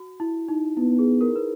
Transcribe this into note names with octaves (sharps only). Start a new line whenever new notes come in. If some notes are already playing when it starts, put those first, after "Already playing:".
Already playing: F#4
E4
D#4
B3 E4
G#4
A#4
B4